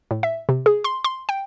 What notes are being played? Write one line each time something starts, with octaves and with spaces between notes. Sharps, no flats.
A2
E5
C3
G#4
C6
C6
G5